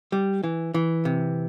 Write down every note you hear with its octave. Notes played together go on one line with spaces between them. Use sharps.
G3
E3
E3
C3